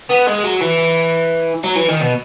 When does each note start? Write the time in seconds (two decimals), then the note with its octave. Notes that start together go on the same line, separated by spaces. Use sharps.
0.10 B3
0.27 G#3
0.44 F#3
0.61 E3
1.64 F#3
1.75 E3
1.89 D#3
2.01 B2